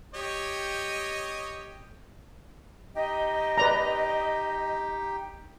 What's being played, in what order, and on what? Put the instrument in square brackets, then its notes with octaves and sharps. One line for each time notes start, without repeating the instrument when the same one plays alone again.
[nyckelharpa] G4 G5 [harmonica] C#5 D#5
[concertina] D#4 G4 G5 [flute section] D#5
[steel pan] B4 D5 A#5